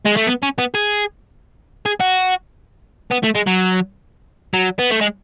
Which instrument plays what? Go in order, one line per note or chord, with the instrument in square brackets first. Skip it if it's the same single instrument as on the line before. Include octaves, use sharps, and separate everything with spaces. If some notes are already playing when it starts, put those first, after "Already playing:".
[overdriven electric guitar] G#3
A3
B3
C#4
B3
G#4
G#4
F#4
B3
A3
G#3
F#3
F#3
B3
A3
G#3